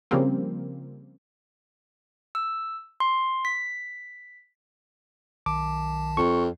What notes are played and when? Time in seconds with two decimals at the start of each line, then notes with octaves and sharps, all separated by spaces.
0.11 C#3 F3 G3 A#3 C4
2.35 E6
3.00 C6
3.45 B6
5.46 B1 D#3 A5 D6
6.17 F2 C#6